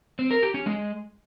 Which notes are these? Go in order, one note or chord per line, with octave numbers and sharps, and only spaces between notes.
C4
A#4
G4
C#4
G#3